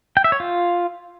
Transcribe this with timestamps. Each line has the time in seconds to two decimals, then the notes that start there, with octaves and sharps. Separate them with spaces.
0.17 G5
0.24 E5
0.32 C#5
0.40 F4